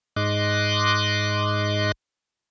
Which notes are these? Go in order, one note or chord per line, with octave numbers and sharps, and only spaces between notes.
G#2 D#5 C6 D6 F#6